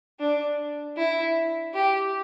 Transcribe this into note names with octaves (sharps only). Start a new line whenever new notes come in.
D4
E4
G4